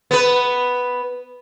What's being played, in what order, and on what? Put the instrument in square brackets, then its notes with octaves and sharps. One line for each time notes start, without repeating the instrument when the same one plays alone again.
[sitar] B3 B4